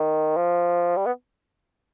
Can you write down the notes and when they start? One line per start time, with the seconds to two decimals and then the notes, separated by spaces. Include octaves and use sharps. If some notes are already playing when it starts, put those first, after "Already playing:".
Already playing: D#3
0.37 F3
0.96 G3
1.06 B3